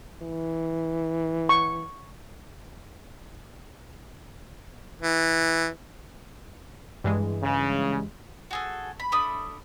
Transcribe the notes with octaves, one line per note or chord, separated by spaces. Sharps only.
E3
C#6
E3
G2 E3 G#3
C#3
F#4 G#4 A4
B5
A3 D4 B5 D#6